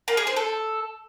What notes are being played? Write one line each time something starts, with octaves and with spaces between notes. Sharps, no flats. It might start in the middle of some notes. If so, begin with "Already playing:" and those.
A#3
G#4
C5
A4